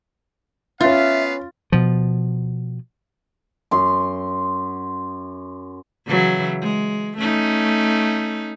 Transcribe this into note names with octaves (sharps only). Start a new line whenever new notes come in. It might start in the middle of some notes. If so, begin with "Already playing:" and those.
B3 C#4 F4 B4 E5 F5 A6
B2 F3
F#2 C6
C#3 E3 F#3
G#3
A3 C#4 D#4